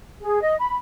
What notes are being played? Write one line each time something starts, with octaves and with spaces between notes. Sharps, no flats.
G#4
D#5
B5